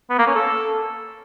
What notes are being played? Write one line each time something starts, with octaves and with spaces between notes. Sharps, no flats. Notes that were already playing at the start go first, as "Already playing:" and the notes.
B3
A#3
C#4
A4